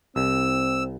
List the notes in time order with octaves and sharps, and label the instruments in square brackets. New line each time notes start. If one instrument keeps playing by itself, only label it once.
[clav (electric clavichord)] C2 [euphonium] C4 [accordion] E6